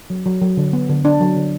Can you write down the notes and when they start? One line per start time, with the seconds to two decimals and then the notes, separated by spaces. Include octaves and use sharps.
0.10 F#3
0.26 F#3
0.42 F#3
0.57 D3
0.73 B3
0.89 D3
1.05 D3 D4
1.21 F#3
1.37 D3